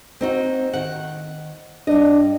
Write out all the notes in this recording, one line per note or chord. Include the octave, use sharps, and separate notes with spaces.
C4 D#4 F#4
D#3 F#5
G2 D4 D#5